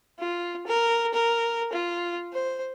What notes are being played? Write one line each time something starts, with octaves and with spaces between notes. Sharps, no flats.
F4
A#4
A#4
F4
C5